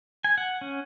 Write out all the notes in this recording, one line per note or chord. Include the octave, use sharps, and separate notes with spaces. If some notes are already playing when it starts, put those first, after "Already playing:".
G#5
F#5
C#4